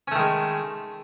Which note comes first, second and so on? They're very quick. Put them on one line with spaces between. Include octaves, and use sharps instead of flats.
C#4 A3 D#3 G#3